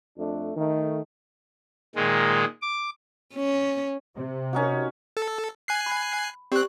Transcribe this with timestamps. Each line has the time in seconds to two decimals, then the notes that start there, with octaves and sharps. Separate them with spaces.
0.18 F2 A3 D4
0.57 D#3 A3
1.96 A#2 D#3 G#3
2.62 D6
3.35 C#4
4.16 C3
4.53 C#4 D#4 F#4
5.17 A4
5.68 G#5 F#6 C7
5.86 B5
6.52 C4 G4 D5 F#6